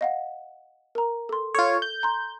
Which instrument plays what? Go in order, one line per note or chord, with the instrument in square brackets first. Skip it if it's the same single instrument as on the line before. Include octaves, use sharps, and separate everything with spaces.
[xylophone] D#5 F5 F#5
A#4 A#5
A4 C6
[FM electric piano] F4 C#5 [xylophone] A4
[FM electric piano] G6
[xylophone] A#5 C6